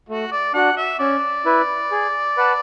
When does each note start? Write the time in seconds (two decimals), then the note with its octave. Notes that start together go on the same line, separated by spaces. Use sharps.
0.09 A3 F#4
0.32 D5
0.54 D4 F#4 F#5
0.78 E5
0.99 C#4 D5
1.45 E4 B4
1.91 G#4
2.37 B4 F#5 A5